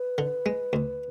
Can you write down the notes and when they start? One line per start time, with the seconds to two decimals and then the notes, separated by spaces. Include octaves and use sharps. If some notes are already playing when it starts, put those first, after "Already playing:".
Already playing: B4
0.18 D3
0.46 G#3
0.73 D2